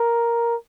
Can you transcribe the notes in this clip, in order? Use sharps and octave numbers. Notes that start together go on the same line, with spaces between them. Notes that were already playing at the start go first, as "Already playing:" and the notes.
Already playing: A#4